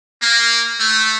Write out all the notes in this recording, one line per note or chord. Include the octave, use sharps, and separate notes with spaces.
A#3
A3